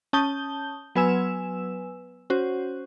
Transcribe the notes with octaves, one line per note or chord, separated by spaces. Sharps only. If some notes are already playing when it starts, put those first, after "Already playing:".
C#4 A5 D#6 G6 G7
F#3 B3 B4 G#5 E6 E7
C#4 F#4 C5